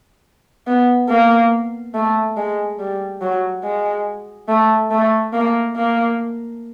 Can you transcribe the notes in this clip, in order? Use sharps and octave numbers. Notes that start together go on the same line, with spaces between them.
B3
A#3
A3
G#3
G3
F#3
G#3
A3
A3
A#3
A#3